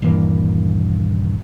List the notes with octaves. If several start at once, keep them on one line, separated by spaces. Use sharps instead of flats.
D#1 G2 E3 A#3